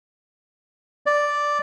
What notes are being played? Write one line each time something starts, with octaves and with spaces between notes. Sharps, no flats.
D5